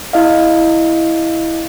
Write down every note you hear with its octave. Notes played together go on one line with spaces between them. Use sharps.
E4 D#5 F5